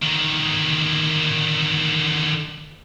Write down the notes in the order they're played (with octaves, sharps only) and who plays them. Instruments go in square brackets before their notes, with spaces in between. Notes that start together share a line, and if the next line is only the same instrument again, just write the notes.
[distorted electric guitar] D3 D#3